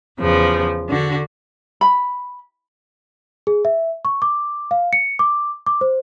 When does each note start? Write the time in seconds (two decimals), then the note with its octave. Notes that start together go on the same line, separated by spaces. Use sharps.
0.19 E2 C#3 F3
0.88 D3 F#4
1.81 B5
3.47 G#4
3.65 E5
4.05 C#6
4.22 D6
4.71 F5
4.93 C#7
5.19 D6
5.66 D6
5.81 C5